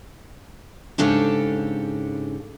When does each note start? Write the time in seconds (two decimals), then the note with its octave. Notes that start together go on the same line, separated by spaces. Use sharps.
0.98 G#2 C#3 D4 G4 A4 C#5